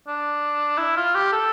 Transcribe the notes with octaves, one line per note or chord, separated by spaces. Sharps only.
D4
E4
F4
G4
A4